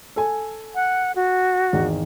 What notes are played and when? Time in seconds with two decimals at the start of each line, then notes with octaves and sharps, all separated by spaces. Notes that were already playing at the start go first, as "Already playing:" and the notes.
0.16 A4 G#5
0.75 F#5
1.16 F#4
1.73 G#1 E2 D#3